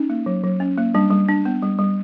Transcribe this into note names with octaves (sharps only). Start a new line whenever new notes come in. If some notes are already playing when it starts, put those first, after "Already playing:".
Already playing: C#4 D#4
A#3
F#3
F#3
C#4
A#3
G3 D4
G3
D4
B3
G3
G3